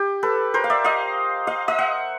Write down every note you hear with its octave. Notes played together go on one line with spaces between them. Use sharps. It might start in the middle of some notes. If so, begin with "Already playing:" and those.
Already playing: G4
A4 B4
A#4 C5
F5
D5 E5
D#5 F5
D#5 F5
D#5 F5
E5 F#5